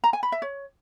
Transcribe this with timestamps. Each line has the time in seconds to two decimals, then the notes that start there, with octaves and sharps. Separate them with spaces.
0.04 A#5
0.13 G#5
0.23 B5
0.32 E5
0.42 C#5